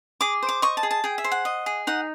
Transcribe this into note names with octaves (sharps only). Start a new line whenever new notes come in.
G#4 D6
C5
D6
D#5 C#6
A5
G#4
A5
G#4 G5
E5
C5
F#5
D#5
G#4
D#4 F#5